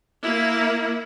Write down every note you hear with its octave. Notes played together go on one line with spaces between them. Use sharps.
A#3 E4